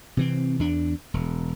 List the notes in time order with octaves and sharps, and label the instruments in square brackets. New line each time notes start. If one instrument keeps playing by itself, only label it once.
[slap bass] C3 E3 C4
E2 D4
E1